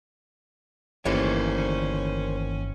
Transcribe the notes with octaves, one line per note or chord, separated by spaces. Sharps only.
G1 D#2 E3 A3 C#4 A#4 C5 C#5